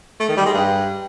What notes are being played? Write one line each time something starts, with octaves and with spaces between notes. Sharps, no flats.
A3
D#3
G3
G#3
G2